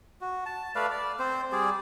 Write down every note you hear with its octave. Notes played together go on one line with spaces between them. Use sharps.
F#4
A5
A3 B4 D5 F5
D5
C4 C5
G3 G#4 D5